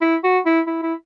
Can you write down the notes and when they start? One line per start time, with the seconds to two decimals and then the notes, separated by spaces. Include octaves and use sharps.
0.01 E4
0.24 F#4
0.46 E4
0.67 E4
0.83 E4